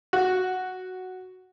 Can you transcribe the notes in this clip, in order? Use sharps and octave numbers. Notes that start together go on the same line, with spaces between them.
F#4